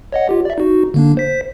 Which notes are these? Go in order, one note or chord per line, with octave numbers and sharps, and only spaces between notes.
C#5 D#5 F#5
F4 G4
D5 E5
D#4 F#4
D3 A#3 D4
C5 B6